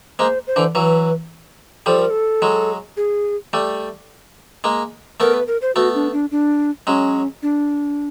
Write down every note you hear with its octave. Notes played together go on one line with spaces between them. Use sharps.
G#3 A#3 C5
C5
D3 E3
E3 F#3 B4
F3 G3 A4
A#4
A4
F#3 G#3
G#4
G3 A3
G#3 A#3
A3 B3 A#4
B4
A#4
C5
A3 B3 F#4
D4
D4
D4
F#3 G#3 C#4
D4